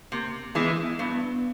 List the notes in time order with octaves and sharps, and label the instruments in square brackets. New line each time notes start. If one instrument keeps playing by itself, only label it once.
[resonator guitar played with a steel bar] C3 [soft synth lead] A#3
[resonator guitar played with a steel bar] E3 G#3 [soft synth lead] B3
[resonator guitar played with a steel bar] G2 [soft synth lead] B3